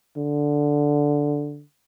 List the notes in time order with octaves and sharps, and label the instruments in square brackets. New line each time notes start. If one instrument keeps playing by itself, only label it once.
[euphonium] D3